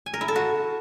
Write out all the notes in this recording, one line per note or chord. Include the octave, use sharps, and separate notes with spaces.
G#5
A#4
E4
A4
F#4